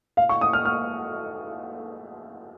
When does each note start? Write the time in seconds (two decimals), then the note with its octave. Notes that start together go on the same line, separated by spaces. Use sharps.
0.17 F5
0.29 C#6
0.41 D#6
0.53 F6
0.65 F6